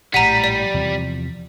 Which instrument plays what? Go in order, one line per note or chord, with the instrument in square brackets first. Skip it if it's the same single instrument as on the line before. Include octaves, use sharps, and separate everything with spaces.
[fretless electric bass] A#1 A2 [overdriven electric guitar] G3 [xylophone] F#5 A#5 [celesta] B6 D#7
[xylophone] D5
[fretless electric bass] E2 C3 F3